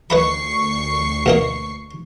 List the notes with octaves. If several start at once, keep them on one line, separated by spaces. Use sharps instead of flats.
D2 B4 D#5 B5 C#6 C7
B2 A#3 D#5